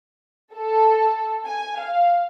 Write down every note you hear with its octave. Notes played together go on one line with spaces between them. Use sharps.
A4
G#5
F5